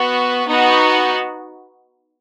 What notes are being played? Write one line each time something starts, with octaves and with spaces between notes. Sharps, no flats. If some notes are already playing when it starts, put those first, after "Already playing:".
Already playing: B3 F#4 B4
B3 D#4 F#4